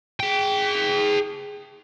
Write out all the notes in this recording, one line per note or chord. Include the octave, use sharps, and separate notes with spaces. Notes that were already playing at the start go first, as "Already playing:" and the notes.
G#4 G5